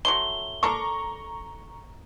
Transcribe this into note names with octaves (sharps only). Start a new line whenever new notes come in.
F#3 A3 C6 G7
D4 A4 A#4 A#5 C#6